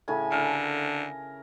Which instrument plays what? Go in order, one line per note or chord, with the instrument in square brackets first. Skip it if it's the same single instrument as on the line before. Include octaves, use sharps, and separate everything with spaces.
[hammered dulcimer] A2 C#3 G#5
[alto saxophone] D3 [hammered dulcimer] A#4